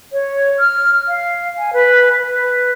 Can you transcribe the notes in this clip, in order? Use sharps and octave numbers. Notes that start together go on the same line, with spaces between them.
C#5
F6
F5
G#5
B4
B4